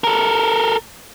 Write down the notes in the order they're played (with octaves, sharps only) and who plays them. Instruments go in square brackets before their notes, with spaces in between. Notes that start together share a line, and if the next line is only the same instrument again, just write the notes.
[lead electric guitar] A4 A#4